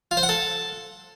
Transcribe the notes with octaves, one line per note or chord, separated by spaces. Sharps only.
F4
C5
F#5
A4